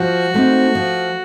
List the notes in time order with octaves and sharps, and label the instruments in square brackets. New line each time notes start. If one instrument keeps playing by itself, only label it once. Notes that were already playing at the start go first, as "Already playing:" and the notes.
Already playing: [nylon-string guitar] F3 [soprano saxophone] F#4
[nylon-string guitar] A3 C4 D#4
F3